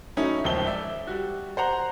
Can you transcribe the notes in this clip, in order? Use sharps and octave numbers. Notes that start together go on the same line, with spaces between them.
F#3 A3 C#4 D#4 E4
D#1 C#2 F3 C4 G7
D5 E5
G3 F#4
C5 F#5 A#5